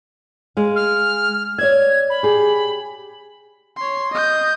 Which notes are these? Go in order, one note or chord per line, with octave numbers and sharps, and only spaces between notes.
G#3 F5
F6
C#5 D5 E5 G#6
B5
G4 G#4
C#5 C6
D#5 G6